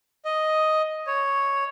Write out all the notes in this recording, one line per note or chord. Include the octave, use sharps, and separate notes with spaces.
D#5
C#5